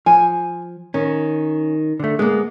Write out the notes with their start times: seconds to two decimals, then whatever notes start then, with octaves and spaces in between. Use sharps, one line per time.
0.06 F3 G#5
0.94 D#3 C#4
2.00 D3 A3
2.19 G#3 A#3 B3